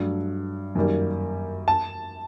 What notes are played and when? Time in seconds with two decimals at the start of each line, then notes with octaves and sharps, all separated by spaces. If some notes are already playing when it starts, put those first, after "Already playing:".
Already playing: G2 F#3 A3
0.75 F#2 D#3 G3 A#3
1.68 A5